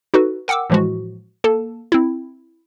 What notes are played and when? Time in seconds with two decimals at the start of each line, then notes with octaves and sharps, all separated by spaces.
0.14 D#4 F#4 A4 B4
0.48 A#4 F#5 G5 D6 E6
0.70 A2 E3 F3 G#3 F#4
1.44 A#3 A4 A5
1.92 C4 E4